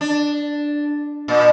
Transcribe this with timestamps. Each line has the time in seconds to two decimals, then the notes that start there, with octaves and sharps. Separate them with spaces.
0.01 D4
1.28 A#2